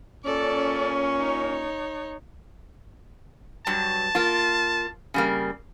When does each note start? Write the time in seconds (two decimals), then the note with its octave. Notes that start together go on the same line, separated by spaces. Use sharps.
0.24 A#2 C#4 A4 D5
1.19 D#4 C#5
3.67 G2 F#3 A5
4.15 A#3 F4
5.14 C#3 G3 A#3